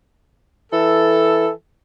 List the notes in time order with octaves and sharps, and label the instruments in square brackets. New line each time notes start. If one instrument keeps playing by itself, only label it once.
[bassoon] E3 [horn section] A4